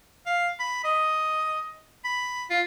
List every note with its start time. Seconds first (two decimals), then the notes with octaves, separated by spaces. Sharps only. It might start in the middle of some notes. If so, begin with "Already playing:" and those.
0.26 F5
0.60 B5
0.84 D#5
2.04 B5
2.50 F4